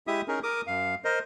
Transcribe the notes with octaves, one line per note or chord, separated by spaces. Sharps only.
G#3 E4 G4 E5 D#6
C#4 D#4 G#4 A#4
A#4 D6 D#6
F#2 F5
A#4 C5 D#5